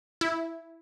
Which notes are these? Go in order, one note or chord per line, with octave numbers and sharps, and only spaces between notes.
E4